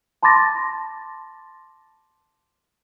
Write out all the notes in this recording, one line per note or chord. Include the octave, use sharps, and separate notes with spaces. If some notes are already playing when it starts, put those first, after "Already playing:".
A5 B5 C6 D6 A6 A#6